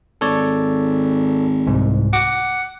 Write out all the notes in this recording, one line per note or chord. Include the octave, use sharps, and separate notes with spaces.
G#1 A4 C#5 D5
C2 G#2
F#5 D6